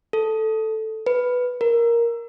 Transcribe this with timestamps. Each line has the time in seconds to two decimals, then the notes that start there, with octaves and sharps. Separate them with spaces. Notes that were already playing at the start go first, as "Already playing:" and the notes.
0.13 A4
1.06 B4
1.61 A#4